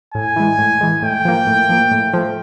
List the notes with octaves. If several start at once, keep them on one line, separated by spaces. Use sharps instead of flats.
A2 G#5
E3 G#3
A2
E3 G#3
A2 G5
F3 A#3
A2
F3 A#3
A2
F3 A3